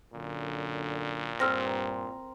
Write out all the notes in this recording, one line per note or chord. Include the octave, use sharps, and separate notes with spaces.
F#2 A#2 D3
G2 C4 A#4 E6 F6 A#6